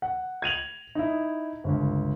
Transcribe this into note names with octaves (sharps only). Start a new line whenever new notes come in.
F#5
G#6 D#7 F7 F#7
D#4 E4
G1 C#2